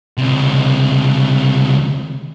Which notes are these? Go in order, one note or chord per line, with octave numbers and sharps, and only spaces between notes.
C#2 C3